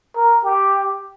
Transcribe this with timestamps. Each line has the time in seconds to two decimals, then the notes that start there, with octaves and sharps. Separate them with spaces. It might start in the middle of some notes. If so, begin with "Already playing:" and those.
0.17 A#4
0.44 G4